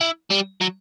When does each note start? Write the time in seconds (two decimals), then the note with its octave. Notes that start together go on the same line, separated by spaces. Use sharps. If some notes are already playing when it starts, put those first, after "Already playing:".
0.01 E4
0.30 G3
0.61 F#3